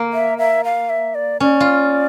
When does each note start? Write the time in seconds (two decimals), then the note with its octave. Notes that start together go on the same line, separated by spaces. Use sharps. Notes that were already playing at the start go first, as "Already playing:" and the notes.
Already playing: A#3
0.13 E5
0.38 E5
0.64 F5
0.90 E5
1.15 D5
1.40 C#4 D5
1.60 F4